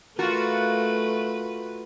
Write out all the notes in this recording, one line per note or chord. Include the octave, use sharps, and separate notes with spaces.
A3 F4 F#4 A#4 B4